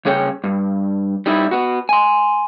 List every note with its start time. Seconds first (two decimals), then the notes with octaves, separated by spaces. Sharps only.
0.05 C2 C#3 G#4 C#5 G5
0.44 G2
1.26 G3 D#4 E4
1.51 B3 F#4
1.89 G#5 C6